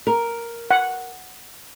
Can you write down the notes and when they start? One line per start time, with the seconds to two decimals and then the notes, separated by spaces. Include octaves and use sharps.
0.07 A#4
0.71 F#5